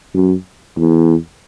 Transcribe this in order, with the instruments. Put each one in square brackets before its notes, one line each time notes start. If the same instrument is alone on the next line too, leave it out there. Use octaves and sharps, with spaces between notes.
[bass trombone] F#2
E2